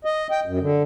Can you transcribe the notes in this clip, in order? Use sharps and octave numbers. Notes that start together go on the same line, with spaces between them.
D#5
G5
F#2
D3